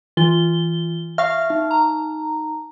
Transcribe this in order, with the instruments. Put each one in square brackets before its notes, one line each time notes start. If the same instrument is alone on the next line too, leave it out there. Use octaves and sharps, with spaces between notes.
[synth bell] E3 F4 G7
[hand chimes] E5 [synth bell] F5 C#6 F6
[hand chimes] D#4
[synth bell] A#5